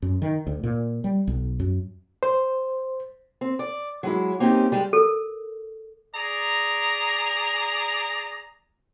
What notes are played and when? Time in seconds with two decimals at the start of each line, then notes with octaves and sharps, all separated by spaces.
0.02 F#2
0.22 D#3
0.47 D2
0.64 A#2
1.04 G3
1.27 B1
1.60 F#2
2.23 C5
3.41 C4
3.59 D5
4.03 F#3 G#3 E4
4.40 A#3 C4 C#4 D#4 G4
4.72 G3 G#3
4.93 A4 A#4
6.14 G#4 D5 A#5